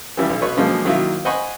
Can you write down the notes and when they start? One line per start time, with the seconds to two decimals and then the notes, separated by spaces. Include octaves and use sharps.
0.17 E3 F3 G3 C#4 E4
0.30 B1
0.42 B2 B4 C#5 C#6
0.57 B2 D3 F3 F#3 G#3 A#3
0.85 D#3 F#3 A#3 E4 F4
1.25 C5 D#5 F#5 G#5 B5 C#6